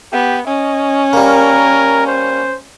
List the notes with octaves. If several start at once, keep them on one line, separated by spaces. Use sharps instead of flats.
B3 G4
C#4 D#5
G3 A#3 A#4
C5